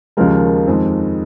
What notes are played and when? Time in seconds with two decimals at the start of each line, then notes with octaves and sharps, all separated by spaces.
0.17 D#2 C#3 F3 G#3 A#4
0.67 F2 D#3 G#3